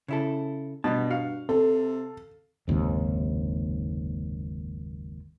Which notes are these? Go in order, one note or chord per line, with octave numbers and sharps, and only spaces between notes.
C#3 E4 A4
G2 B2 G3 B3 A5
F#4 F5
C3 A4
F#1 D#2 G#2 C3